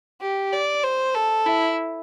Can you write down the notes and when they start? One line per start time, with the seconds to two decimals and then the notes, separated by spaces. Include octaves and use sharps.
0.21 G4
0.53 D5
0.84 C5
1.15 A4
1.46 E4